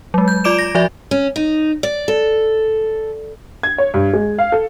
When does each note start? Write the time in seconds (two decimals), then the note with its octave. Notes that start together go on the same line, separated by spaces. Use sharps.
0.14 F#3 G#3
0.28 G6
0.44 F4 D5 D6 D7 E7
0.58 A#6
0.75 F3 F#4 D5 E5
1.11 C#4
1.36 D#4
1.83 D5
2.08 A4
3.63 G#6
3.78 C#5
3.94 G2
4.13 G#3
4.39 F5
4.52 A4